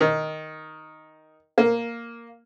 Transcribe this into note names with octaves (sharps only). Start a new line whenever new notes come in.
D#3
A#3